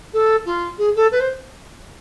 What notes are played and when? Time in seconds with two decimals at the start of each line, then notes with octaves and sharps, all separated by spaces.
0.13 A4
0.46 F4
0.78 G#4
0.96 A4
1.11 B4
1.20 C5